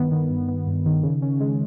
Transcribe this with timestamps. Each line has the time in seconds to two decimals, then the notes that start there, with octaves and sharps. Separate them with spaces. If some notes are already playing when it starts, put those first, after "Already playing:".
Already playing: G2 D#3 B3
0.12 D#3
0.30 G2
0.48 B3
0.67 G2
0.86 D#3
1.03 C#3
1.22 C#4
1.40 G#3